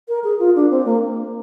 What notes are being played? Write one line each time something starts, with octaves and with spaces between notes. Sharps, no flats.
A#4
G#4
F4
D4
C4
A#3